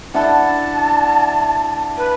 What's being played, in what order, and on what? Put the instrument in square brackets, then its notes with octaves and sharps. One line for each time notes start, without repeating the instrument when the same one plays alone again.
[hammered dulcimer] D4 E4 F#5 [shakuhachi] A5
[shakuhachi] B4